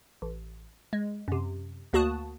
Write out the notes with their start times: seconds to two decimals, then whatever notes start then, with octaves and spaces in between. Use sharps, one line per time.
0.22 A1
0.93 G#3
1.28 F#2 C3
1.93 D2 A#3 F#4 A5 D#6 F#6